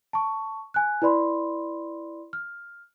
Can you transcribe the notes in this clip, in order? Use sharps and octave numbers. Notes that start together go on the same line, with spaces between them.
A5 C#6
G#5 F#6
E4 B4 D5 B5 C6
F6